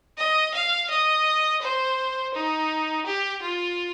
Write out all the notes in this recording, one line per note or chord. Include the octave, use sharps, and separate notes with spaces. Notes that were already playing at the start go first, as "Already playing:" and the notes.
D#5
F5
D#5
C5
D#4
G4
F4